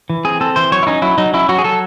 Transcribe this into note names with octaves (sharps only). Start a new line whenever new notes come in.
E3
C4 G#4
C4 A4
E3 C5
F#3 C#5
E4
C#4 D#4
F#3 E4
F#3 D#4
C#4 E4
F#3 F#4
G#4
F#3 A4